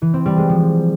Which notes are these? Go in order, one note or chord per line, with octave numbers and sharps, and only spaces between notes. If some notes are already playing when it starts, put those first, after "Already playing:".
E3
C4
G3
G#3
F3